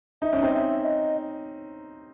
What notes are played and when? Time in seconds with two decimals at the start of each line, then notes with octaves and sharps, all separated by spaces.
0.22 D#4 E5
0.33 C#4
0.42 C4 D#4
0.53 E5
0.84 D#5